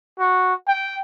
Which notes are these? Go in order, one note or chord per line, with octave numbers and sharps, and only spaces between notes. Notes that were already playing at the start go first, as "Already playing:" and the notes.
F#4
G5